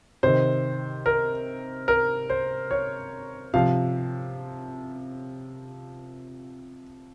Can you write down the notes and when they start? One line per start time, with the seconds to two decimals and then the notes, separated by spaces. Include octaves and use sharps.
0.23 C3 D#3 C5
1.06 A#4
1.88 A#4
2.30 C5
2.71 C#5
3.54 C3 F3 F5